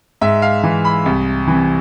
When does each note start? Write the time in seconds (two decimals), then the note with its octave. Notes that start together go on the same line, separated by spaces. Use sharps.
0.21 G#2 E5
0.42 F5
0.63 E3
0.85 B5
1.06 C2
1.47 C3 E3